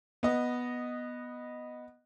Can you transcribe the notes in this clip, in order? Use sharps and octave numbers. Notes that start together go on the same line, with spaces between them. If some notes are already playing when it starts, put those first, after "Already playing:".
B3 D#5